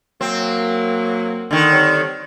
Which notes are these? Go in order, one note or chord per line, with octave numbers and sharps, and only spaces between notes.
F#3 A#3 C4
D3 D#3
G3 C4 C#5